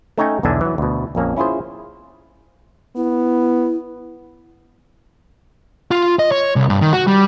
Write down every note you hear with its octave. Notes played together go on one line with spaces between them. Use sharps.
A3 C#4 D#4 C#5 G5 G#5
B1 E2 D3 D4 E5 G#5
E3 F#3
D2 B2
A#1 F2 A#3 C#4
C#4 E4 F4 G#4 C5
B3 E4
F4
D#5
C#5
C2
G2
D#3
F#4
G3